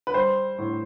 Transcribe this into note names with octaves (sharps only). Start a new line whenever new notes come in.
B4
G3 C5
A2